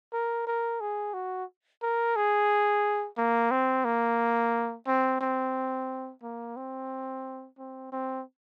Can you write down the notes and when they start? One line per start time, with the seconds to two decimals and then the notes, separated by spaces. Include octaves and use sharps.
0.13 A#4
0.47 A#4
0.81 G#4
1.14 F#4
1.82 A#4
2.16 G#4
3.18 A#3
3.51 C4
3.85 A#3
4.87 C4
5.21 C4
6.23 A#3
6.56 C4
7.58 C4
7.92 C4